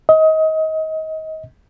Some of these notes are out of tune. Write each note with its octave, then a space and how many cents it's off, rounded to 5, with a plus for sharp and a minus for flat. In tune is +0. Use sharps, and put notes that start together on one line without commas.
D#5 +25